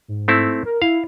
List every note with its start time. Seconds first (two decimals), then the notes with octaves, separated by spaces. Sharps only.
0.08 G#2
0.28 A3 C4 E4
0.65 A#4
0.82 E4 F5